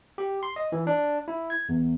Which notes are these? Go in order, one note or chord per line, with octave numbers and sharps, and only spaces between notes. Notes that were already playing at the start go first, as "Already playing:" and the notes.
G4
C6
D#5
E3
D4
E4
G#6
E2